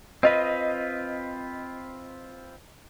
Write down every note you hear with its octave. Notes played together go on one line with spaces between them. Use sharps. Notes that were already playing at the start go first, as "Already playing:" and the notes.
C4 F4 B4 D#5